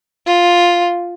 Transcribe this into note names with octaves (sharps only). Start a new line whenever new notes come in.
F4